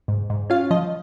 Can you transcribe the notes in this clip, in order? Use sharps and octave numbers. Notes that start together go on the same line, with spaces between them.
G#2
G#2
C#4 F4 F5
F3 D#5